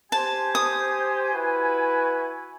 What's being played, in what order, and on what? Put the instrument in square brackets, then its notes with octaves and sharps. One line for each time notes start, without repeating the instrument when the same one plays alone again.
[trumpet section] G4 C5 [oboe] G#5 [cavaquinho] A5
[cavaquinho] D#6
[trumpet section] E4 F#4 B4